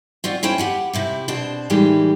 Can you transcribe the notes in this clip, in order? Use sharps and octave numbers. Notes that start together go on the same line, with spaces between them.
C4 F4 F#4 D5
C#4 E4 C5 C#5 G5
G4 F#5 G#5
C3 E4 G4
B2 C4 D4 C5
A2 D#3 E3 G3 G#3 G4